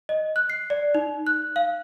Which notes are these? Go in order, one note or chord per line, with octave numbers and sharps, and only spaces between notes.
D#5
F#6
C7
D5
D#4
F#6
F5